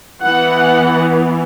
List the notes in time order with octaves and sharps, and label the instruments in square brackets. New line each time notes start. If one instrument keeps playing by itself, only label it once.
[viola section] E3 B3 F#5